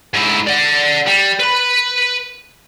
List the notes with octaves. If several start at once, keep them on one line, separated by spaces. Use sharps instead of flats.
G#2 E4
D5 F#5
G3
B4 B5